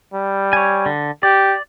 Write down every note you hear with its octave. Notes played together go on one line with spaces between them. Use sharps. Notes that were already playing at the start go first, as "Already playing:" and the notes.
G3
C#5 G#5
D3
G4 D5